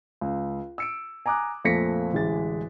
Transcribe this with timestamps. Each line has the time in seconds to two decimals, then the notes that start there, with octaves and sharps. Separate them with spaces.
0.21 C#2
0.78 E6 C#7 D7
1.26 G#5 A#5 D6 D#6 F#6
1.65 F2 A#2 A3 A#6 B6 C#7
2.12 D1 A1 G#3 A6